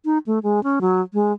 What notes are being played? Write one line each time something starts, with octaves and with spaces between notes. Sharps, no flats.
D#4
A3
G#3
C#4
F#3
G#3